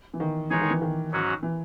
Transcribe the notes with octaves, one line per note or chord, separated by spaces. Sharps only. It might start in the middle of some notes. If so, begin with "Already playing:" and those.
E3
D#3
E3 G#3 D#4 G#4 C#5
D#3
E3
D#3
G#2 F#3 C#4 F#4
E3